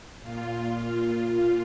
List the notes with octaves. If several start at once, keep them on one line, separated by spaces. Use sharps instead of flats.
A#2 F4